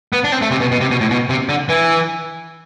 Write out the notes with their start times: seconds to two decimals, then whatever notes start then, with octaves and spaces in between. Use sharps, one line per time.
0.13 B3
0.24 D4
0.32 C4
0.42 A3
0.51 C3
0.61 B2
0.71 B2
0.81 C3
0.91 B2
1.00 A2
1.10 B2
1.29 C3
1.49 D3
1.69 E3